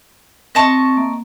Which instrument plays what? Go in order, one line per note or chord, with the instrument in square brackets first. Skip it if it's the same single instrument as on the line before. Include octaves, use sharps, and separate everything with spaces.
[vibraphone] C4 E5 [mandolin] D#5 A5 C#6
[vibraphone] A#3